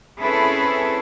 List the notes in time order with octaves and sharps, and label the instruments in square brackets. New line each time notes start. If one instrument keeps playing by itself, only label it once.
[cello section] C4 C#4 E4 G#4 A4 B4